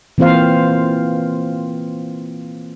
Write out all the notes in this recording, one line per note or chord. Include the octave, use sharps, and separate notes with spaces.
E3 A#3 C4 F4 C5 F5